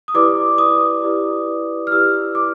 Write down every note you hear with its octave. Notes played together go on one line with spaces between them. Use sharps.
D#6
E4 G4 B4 D5 D6
D#6
E4 G4 B4 D5
F6
E4 G4 B4 D5 E6
D6